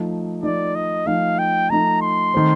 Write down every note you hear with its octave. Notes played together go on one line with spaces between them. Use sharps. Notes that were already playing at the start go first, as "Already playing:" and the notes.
Already playing: F3 A3 D#4
F3 A3 D#4 D5
D#5
F3 A3 D#4 F5
G5
F3 A3 D#4 A#5
C6
D#3 A3 C4